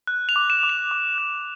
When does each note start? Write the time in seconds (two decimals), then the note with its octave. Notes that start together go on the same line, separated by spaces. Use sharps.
0.07 F#6
0.29 F7
0.36 D6
0.50 E7
0.63 D6
0.69 F7
0.91 D6
1.18 F#6